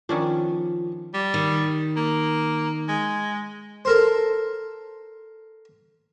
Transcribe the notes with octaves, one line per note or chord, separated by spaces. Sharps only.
D#3 F3 C#4 D4
G3
D#3
A#3
G#3
A4 A#4 C5